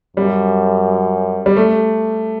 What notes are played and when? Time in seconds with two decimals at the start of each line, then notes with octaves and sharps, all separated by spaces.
0.17 F#2 G3
1.46 G3
1.57 A3